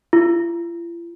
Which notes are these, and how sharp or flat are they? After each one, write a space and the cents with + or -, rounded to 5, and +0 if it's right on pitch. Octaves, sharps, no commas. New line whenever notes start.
F4 -45